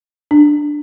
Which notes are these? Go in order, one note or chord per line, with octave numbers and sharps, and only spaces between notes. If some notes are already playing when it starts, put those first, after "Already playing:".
D4